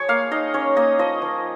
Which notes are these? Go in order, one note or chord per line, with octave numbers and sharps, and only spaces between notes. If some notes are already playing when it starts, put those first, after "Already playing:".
Already playing: F3 G#4 C#5
A#3 F5
D#4 D#5
C#4 C#5
A#3 D#5
F3 D#5
F3